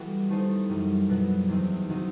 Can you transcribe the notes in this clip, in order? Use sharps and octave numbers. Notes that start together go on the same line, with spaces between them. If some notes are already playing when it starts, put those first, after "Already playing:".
Already playing: E3 G3 A3 B3 F#4
D#3 A3 D#4 A4 C5
F#2 E3 G3
B2 F#3 B3 F#4
E2 D#3 F#3 C4 D#4
D#3 F#3 C4 D#4